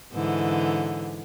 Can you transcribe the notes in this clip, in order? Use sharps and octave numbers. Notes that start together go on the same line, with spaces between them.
G#2 D3 E3